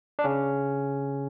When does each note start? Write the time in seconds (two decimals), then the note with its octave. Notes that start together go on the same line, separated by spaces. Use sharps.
0.19 D4
0.24 C#3 C#4